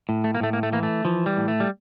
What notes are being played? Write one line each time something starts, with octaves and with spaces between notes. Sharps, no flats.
A2
A3
A#3
A2 A3
A#3
A3
E3 A#3
A3
E3 F3
G3
A2
A3
G3